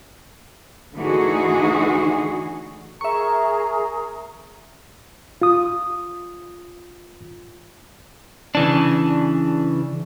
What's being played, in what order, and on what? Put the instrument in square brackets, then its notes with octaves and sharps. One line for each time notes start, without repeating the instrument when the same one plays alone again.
[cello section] D3 E3 A3 D#4 F#4 G#4
[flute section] G#4 A#4 A#5 [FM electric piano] E5 C#6
[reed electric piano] F4 D#6
[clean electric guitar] C#3 E3 D4